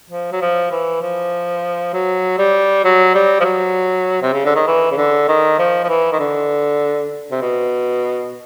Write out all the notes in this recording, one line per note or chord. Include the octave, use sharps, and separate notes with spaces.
F3
F#3
F3
E3
F3
F#3
G3
F#3
G3
F3
F#3
C3
C#3
D3
D#3
E3
C#3
D3
D#3
F3
F3
E3
D#3
D3
C3
B2